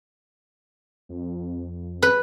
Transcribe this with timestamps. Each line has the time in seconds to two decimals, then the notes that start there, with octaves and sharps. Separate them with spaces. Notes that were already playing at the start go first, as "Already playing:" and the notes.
1.09 F2
2.02 B4